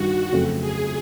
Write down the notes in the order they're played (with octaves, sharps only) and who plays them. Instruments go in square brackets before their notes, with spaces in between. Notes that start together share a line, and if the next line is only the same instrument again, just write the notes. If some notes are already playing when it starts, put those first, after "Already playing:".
Already playing: [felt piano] G2 D#3 G3 [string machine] F#4
[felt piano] F2 C#3 F#3 A3 C4
[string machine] G#4